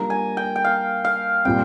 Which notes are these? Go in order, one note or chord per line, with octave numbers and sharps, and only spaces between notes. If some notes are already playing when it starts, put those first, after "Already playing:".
Already playing: G3 A#3 D4 F4 A#5
G#5
G5
G5
F5
F5
A#2 G3 C4 G5